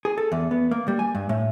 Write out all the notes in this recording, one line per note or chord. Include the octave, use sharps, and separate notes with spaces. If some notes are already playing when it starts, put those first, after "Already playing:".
G#4
A4
E2
B3
A#3
G3
G#5
G2
A2